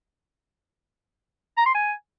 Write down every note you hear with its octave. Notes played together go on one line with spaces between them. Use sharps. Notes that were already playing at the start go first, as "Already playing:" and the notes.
A#5
C6
G#5